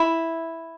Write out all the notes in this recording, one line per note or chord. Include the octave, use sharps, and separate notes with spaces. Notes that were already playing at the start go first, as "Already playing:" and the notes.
Already playing: E4